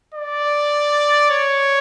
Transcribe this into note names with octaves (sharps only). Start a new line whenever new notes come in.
D5
C#5